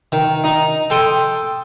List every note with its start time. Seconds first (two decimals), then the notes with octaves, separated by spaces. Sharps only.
0.12 D#3
0.44 D#4
0.90 A4 G5 C6 D#6